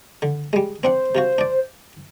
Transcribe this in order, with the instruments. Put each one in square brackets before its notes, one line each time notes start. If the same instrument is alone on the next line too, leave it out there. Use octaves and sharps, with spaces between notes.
[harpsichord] D3
G3 G#3
[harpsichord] C4 D4 F#5 [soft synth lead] C5
[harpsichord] C3 F4 F#4
D4 D5